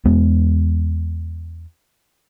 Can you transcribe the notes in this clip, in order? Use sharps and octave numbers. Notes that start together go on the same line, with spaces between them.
E2 G#3 B3